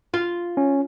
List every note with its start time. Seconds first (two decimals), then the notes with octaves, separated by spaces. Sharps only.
0.14 F4
0.57 C#4